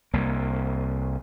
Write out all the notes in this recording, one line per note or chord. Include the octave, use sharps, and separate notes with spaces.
C2 A#3